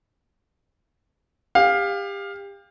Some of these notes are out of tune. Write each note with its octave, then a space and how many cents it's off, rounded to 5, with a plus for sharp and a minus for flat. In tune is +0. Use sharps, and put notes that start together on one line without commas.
G4 +30 F5 +10